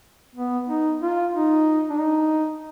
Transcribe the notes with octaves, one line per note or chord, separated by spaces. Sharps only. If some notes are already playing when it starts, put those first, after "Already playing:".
B3
D#4
F4
D#4
D4
D#4